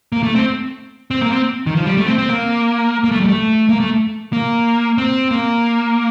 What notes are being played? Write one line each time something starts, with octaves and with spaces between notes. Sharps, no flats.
A#3
A3
C4
C4
A#3
C4
D#3
F3
G3
A3
C4
C4
A#3
A#3
A3
G3
A3
A#3
A3
A#3
C4
A#3